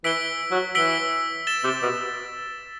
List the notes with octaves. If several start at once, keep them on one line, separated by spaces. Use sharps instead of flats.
E3 E6 B6 D7 G7
F#3
E3 E6 B6 D7 G7
A6 E7 G7
C3
B2